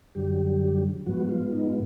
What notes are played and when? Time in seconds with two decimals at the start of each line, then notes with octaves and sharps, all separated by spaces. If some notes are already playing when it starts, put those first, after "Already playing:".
0.15 F#2 D3 F#3 G3 G4
1.06 G#2 F3 F#3 G#3 B3 F#4
1.29 F3 F4
1.52 D#4
1.67 F4